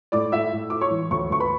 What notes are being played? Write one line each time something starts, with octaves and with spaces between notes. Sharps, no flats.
A2 D5 D6
A2 E5 E6
A2
A2 D6
C#5 C#6
E3
D2 C#5 C#6
D2 C#6
B4 B5